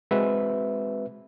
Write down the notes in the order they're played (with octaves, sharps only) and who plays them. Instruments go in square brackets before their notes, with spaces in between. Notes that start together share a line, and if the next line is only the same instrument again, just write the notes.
[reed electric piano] G#3 C4 F#4 B4 E5